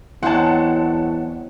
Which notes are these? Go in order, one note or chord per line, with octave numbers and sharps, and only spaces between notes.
E2 F#3 G#3 C4 F#5 A5